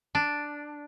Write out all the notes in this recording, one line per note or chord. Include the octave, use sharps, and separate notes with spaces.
D4